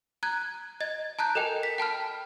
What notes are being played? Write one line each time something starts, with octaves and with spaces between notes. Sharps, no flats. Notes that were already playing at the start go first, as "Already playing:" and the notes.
A#5 F#6 G#6
D#5 G#6 A6
A5 A#5 F#6 G6
A4 A#4 D#5 G5 G#5
B6
G5 A5 B5 F6